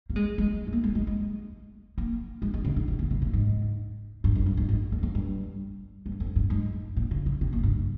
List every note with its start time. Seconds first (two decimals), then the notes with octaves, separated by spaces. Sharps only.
0.09 A#3
0.16 G#3
0.38 G#3
0.67 G#3
0.73 A#3
0.84 G#3
0.95 G#3
1.07 G#3
1.98 A#3
2.42 G#3
2.54 G#3
2.65 C#3
2.76 D#3
2.88 C3
2.99 C#3
3.10 C3
3.22 A#2
3.33 G#2
4.24 G2
4.35 F2
4.46 G2
4.57 G#2
4.69 G#2
4.92 F2
5.03 F2
5.15 G2
6.06 G2
6.20 F2
6.36 G2
6.50 G#2
6.97 A#2
7.11 C#3
7.26 C#3
7.41 C3
7.53 A#2
7.63 G2